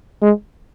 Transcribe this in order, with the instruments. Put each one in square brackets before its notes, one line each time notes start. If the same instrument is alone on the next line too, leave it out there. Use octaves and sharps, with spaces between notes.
[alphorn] G#3